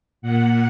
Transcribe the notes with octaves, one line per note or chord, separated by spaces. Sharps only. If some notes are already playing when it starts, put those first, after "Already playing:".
A#2 F#5